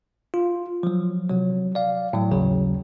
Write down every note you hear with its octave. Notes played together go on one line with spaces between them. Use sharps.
F4
F3 F#3
C3 F#3
D5 F5
A2 F#3
A#1 D#2 C#3 F#3